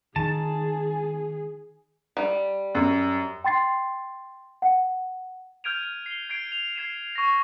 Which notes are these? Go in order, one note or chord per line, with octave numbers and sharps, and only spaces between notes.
D#3 G#4 G#5 A5
G3
F#2
G5 C6 A6 C7
F#5
F6 G6 G#6 D7 D#7 F7
C7 G7
G#6 C7 D7
F7
G#6 C7 D#7 E7
C#6 A#6